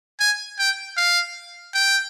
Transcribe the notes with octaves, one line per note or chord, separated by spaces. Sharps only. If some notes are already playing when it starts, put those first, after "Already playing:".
G#5
G5
F5
G5